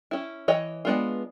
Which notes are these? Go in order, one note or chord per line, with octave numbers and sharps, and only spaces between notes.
C#4 E4
E3 C#5 D#5
G#3 B3 D4 F4